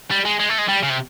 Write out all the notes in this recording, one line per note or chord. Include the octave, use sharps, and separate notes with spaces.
G3
G#3
G#3
A3
G#3
G3
C#3
C3